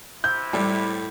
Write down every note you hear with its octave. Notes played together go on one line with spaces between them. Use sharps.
C3 E4 G6
A2 G3